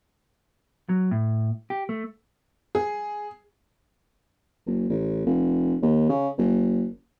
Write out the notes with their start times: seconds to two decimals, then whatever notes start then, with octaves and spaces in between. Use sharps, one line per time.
0.89 F#3
1.11 A2
1.70 G4
1.89 A3
2.75 G#4
4.66 F#1
4.89 A1
5.26 F1
5.82 D#2
6.09 C#3
6.38 F#1